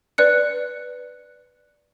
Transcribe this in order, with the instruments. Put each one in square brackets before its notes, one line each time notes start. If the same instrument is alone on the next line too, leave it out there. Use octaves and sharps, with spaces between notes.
[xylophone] B4 D5 F#6 C#7